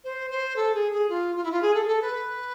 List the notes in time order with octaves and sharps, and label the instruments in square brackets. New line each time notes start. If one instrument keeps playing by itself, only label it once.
[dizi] C5
C5
A4
G#4
G#4
F4
F4
E4
F4
G#4
A4
G#4
A4
B4